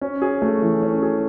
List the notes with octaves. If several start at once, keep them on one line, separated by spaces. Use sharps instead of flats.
C#4
G#4
A3
E3
C#4
G#4